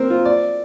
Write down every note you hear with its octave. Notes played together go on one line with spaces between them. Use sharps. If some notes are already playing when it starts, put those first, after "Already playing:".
Already playing: C4 A#4
F4
D5